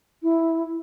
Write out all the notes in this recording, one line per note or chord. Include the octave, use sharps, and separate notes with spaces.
E4